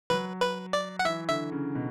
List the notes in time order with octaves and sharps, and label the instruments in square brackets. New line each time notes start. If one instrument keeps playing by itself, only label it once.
[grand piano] F#3 [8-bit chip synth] B4
[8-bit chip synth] B4
D5
F#5
[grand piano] E3 [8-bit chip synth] E5
[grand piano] D3 [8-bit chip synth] E5
[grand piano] C#3
B2